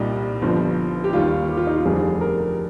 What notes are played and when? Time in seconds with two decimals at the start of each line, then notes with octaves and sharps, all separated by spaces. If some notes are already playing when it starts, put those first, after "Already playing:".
Already playing: C2 A#2 G3 D#4
0.42 G1 G2 F3
1.04 G4
1.13 D#2 D#3 G3 F4
1.49 G4
1.57 F4
1.67 D#4
1.76 F4
1.85 F1 F2 D3 G3 G#4
2.21 A#4